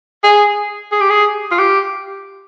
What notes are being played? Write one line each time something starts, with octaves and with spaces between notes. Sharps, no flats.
G#4
G#4
G4
G#4
F4
G4